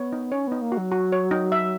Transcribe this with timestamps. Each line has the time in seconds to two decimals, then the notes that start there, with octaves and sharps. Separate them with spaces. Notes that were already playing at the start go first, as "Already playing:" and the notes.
Already playing: B3 C#5
0.13 D#4
0.32 C#4 C#5
0.47 B3 D#4
0.62 A#3
0.72 F#4
0.78 F#3
0.91 F#4
1.12 C#5
1.31 D#4
1.52 E5